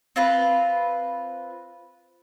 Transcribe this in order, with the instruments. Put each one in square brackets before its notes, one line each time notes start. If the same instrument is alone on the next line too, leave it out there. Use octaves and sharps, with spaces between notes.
[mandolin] C4 F4 B4